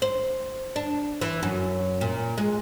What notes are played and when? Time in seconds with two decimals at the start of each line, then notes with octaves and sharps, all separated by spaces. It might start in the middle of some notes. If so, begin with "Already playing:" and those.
0.02 C5
0.76 D4
1.21 E3
1.43 F#2
2.01 A#2
2.38 G#3